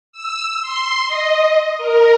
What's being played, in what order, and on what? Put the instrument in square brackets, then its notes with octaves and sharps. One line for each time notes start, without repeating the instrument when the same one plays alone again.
[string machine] E6
C6
D#5
A#4